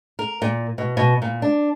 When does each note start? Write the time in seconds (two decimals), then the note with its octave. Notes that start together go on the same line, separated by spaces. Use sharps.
0.19 A#4
0.42 A#2
0.78 B2
0.97 B2
1.22 A#2
1.42 D4